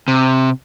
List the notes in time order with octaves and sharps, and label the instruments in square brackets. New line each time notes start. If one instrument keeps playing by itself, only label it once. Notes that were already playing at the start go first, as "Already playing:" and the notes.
[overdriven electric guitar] C3